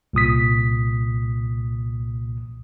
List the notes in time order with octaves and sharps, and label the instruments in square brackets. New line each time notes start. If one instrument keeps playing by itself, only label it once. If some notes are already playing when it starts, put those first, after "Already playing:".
[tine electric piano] C2 A#2 D#6 B6